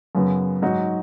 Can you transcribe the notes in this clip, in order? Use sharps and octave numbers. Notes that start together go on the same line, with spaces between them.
F#2 C#3 F#3 B3
G#2 F#3 D#4 F#4